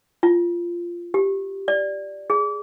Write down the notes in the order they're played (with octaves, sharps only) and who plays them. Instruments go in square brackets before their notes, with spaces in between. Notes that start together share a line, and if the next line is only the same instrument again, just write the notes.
[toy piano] F4
G4
D5
G#4